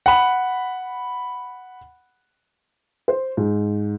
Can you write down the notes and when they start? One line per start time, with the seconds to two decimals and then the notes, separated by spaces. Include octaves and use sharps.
0.06 F#5 B5
3.08 C5
3.37 G#2